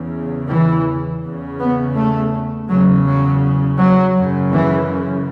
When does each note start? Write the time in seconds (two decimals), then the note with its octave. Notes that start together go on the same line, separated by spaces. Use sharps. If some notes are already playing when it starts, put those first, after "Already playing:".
Already playing: E2 C#3
0.49 E3
1.23 E2 C#3
1.59 B3
1.95 A3
2.69 E2 C#3 F#3
3.05 F#3
3.79 F#3
4.15 F#2 C#3
4.51 E3